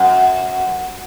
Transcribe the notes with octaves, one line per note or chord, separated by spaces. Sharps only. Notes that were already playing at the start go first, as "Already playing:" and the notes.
Already playing: F#2